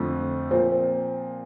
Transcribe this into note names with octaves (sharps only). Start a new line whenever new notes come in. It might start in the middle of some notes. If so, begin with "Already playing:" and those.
Already playing: F2 D3 F3 A3
A#2 F3 C4